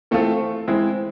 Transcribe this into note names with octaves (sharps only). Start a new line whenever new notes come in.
E3 A3 C4 F4 A4
E3 G#3 C4 E4